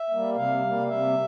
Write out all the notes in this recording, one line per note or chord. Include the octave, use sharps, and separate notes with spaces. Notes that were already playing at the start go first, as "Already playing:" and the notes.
Already playing: E5
G3 A#3
C3 F5
G3 A#3
C3 E5